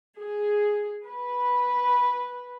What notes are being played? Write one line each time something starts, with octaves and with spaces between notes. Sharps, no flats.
G#4
B4